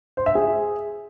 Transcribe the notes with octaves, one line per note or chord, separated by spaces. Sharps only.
C5
E5
G#4